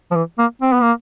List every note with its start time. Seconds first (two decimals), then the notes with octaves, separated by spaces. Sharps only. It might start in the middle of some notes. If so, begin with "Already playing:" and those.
0.11 F3
0.15 E3
0.39 A#3
0.62 C4
0.73 B3
0.82 A#3